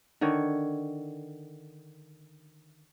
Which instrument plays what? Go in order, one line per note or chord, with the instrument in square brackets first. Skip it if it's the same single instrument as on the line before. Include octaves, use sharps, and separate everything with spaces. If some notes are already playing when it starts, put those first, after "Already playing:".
[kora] D3 D#3 C#5